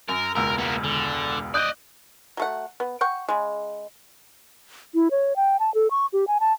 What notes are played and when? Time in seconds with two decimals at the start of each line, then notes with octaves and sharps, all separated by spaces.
0.09 F#2 A#4
0.35 E1 C#2 A#4 E6
0.58 A#3 B3
0.84 D3
1.54 D5 D#5 D#6 F#6 G6
2.37 F#3 A3 F#5
2.80 B3
3.01 F#5 G5 C#6
3.29 C#3 G#3
4.95 E4
5.11 C#5
5.36 G5
5.60 A5
5.74 A4
5.91 C#6
6.13 G4
6.27 G#5
6.40 A5